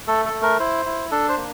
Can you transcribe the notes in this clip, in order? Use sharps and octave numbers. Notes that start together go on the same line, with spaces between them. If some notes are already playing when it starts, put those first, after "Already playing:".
A3 A4
A4
A3
A#4
E4 C5
E4
D4 A4
C5
A#3